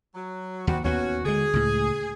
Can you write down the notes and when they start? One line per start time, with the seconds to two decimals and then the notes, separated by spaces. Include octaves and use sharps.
0.15 F#3
0.67 D#2 G3 C4 F#4
0.84 D#2 A#3 B3 C#4 F#4
1.25 D3 G#3 G#4
1.53 C#2 A2